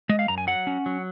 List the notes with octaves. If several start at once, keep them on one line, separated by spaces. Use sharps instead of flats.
G#3 D#5
F5
F#2 A#5
G#5
F#3 F#5
C#4
F#3